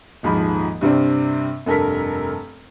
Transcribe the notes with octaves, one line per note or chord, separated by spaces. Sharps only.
D#1 G#2 F3 B5
G2 C3 C4 D4
F1 G2 A4 A#4 B6